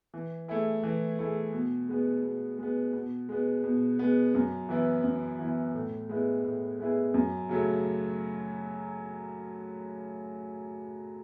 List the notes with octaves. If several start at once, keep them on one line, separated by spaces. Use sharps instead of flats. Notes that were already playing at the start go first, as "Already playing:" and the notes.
E3
A3 E4 G#4
E3
A3 E4 G#4
B2
G#3 B3
B2
G#3 B3
B2
G#3 B3
B2
G#3 B3
F#2
E3 B3 E4
F#2
E3 B3 E4
A2
G#3 B3 E4 G#4
A2
G#3 B3 E4 G#4
F#2
C#3 F#3 A3